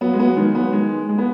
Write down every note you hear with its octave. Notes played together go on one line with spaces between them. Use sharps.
F#3 B3
G#3
F#3 B3
D#3 G#3
F#3 B3
D#3 G#3
G#3
B3